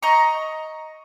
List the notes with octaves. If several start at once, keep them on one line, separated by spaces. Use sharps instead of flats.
D#5 A#5 C#6